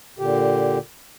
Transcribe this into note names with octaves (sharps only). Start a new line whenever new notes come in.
A#2 D3 G4